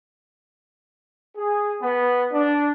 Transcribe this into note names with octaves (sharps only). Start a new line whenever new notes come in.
G#4
B3
D4